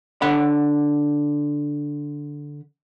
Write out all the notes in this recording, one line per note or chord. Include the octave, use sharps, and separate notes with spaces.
D3 F#5 B5